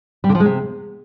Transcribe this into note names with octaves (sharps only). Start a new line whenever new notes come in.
G3
D3
F3
G#3
C3